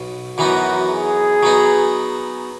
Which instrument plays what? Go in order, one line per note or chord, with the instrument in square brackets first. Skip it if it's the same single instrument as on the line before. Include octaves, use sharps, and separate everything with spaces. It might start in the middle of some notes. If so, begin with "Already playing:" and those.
Already playing: [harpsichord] B1 B2
[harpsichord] F#2 E3 B3 D#4 [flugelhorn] F#4
[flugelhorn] G#4
[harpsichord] F#3 B3 D#4